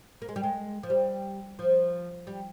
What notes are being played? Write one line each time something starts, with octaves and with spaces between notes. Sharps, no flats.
A#3
G#3
G3
G#3
F3
G3
F3
G3